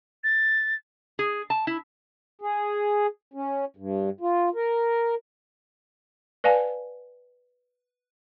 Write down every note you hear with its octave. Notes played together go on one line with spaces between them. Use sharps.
A6
G#4
A5
E4
G#4
C#4
G2
F4
A#4
B4 D5 F5 G#5 A5